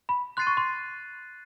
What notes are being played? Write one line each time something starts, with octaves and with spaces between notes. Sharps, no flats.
B5
C6 F#6 A6 C7 D#7
C#6
C6